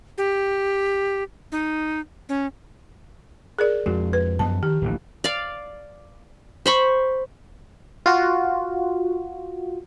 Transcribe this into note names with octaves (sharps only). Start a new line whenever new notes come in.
G4
D#4
C#4
G#4 A#4 D5
F2 G#3 F#4
B4
F#2 F3 A#3 B3 A5
D#3 G4
D1 A#1 E3
D5 F5
C5 B5 C#6
F4 F#4